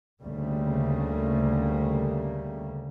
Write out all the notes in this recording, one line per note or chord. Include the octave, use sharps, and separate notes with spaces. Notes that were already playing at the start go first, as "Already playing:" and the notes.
D2 C#3 G3 A3 A#3